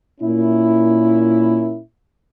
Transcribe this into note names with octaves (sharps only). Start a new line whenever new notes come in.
A#2 A#3 C#4 E4